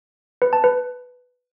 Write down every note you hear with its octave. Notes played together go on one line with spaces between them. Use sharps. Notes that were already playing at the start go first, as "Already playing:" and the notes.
B4
A5
B4